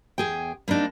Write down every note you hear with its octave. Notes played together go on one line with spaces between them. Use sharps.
E2 G#4 G5
G3 A#3 C4 D4 D#4